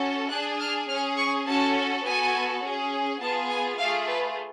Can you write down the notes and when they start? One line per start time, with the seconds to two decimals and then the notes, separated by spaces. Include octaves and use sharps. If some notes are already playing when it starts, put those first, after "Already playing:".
Already playing: C#4 F#4 A4
0.30 D4 G#4 F#6
0.59 F6
0.88 C#4 G#4 F6
1.18 C#6
1.46 C#4 F#4 A4 A5
2.04 B3 F#4 A4 G#5
2.62 C#4 G#4
3.20 B3 F4 G#4 A5
3.49 G#5
3.78 A3 F4 G#4 F5
4.07 B4